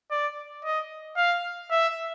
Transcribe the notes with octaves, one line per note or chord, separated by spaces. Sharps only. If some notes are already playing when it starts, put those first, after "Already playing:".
D5
D#5
F5
E5